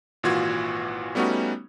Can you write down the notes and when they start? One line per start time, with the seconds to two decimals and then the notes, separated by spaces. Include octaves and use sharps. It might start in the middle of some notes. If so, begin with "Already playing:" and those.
0.23 G#1 A#2 E3 F4 F#4 G#6
1.15 G3 A3 B3 C#4 D#4 F#4